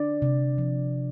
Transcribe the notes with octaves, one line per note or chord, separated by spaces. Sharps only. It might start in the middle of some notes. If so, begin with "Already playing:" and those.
Already playing: D4 D5
C3
F3